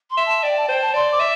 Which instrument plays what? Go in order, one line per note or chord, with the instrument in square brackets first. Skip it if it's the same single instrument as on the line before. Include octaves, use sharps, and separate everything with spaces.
[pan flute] C6
[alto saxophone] E5
[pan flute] A5
[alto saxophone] D5 [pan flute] G5
[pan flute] A5
[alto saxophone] C5 [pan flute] G5
[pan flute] A5
[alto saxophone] D5 [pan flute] C6
[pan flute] D6
[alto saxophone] E5